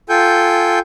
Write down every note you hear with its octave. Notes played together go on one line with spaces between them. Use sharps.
F4 A4 G5 G#5 G6